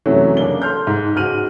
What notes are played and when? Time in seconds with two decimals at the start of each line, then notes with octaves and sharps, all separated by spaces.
0.06 F#2 C3 E3 F#3 A3 C#4
0.37 F#2 C#3 A#3 D4 G7
0.62 A4 C6 F6 G6
0.87 G#2
1.15 C#2 G#2 F#4 F6 D#7 F#7